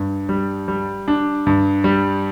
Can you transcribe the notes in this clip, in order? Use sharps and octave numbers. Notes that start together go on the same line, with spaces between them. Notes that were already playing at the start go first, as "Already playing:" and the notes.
Already playing: G2
G3
G3
D4
G2
G3